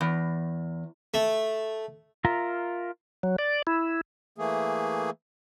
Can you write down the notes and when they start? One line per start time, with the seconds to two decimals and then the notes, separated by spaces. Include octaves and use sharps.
0.01 E2
1.14 A3
2.25 F4 A#4 E5 A#5
3.23 F#3
3.38 D5
3.67 E4
4.38 E3 A3 A#3 G#4